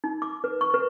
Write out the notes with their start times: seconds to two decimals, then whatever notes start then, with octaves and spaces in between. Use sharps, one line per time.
0.04 D#4
0.22 D6
0.44 B4
0.61 C#6
0.74 B4